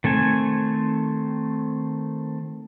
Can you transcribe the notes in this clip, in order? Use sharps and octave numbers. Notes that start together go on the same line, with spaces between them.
D#3 A3 C4 G#5